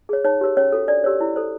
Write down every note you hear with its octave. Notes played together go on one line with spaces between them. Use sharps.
G#4 C#5
D#4 C#5
G4 A#4 C#5
C#4 C#5
F#4 A4
D4 D5
G4 A#4 C#5
E4
A4 C5